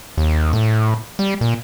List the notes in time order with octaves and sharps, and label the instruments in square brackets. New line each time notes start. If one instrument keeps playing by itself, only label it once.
[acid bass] D#2
A2
G3
A#2